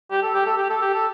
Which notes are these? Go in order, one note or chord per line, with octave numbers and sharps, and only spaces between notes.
G4
A4
G4
A4
G4
A4
G4
A4